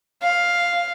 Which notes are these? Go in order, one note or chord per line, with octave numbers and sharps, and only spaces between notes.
F5